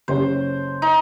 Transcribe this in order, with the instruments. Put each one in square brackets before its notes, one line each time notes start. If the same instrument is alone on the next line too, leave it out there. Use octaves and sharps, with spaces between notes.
[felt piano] F#1 G4 C#5 [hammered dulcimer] C5
[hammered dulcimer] D#4